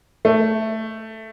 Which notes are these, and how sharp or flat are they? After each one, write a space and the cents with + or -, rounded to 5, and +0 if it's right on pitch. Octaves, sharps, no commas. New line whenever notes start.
A3 +5